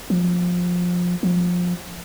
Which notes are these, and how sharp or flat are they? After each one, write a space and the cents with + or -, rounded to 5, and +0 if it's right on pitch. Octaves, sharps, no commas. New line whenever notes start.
F3 +20
F3 +20